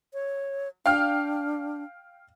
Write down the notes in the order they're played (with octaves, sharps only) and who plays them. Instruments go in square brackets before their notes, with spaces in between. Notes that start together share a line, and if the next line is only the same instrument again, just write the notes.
[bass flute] C#5
[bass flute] D4 [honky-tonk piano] F5 G5 F6